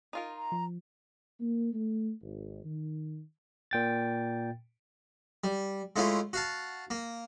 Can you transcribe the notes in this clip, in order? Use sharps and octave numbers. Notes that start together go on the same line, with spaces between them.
D#4 F4 A#4
A#5
F3
A#3
A3
G#1
D#3
A#2 G5 A6
G3
G#3 A3 C#4 E4 F4
F#4 F5 A5
A#3